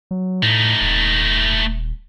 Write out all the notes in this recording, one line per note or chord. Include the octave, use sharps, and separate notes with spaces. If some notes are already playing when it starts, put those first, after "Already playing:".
F#3
A2 A3 D#4
D#1